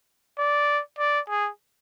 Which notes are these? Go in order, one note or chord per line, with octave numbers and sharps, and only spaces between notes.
D5
D5
G#4